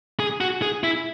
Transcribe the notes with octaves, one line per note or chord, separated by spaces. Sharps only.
G#4
F#4
G#4
E4